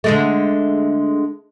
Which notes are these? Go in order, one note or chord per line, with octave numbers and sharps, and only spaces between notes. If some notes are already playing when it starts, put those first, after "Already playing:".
D3 G#3 A3